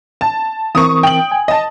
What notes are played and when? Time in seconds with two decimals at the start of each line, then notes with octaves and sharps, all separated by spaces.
0.21 A5
0.75 E3 C4 A#4 C#6 D#6
1.03 G5 F#7
1.31 G#5
1.48 D#5 A5